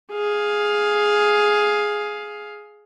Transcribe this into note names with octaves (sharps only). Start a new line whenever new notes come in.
G#4 F5